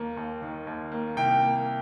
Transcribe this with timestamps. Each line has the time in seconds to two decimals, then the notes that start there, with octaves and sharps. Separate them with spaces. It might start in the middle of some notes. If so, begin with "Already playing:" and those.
Already playing: D#2 A#3
0.17 D#2
0.42 D#3
0.67 D#2
0.92 A#3
1.17 C2 G5
1.42 A#3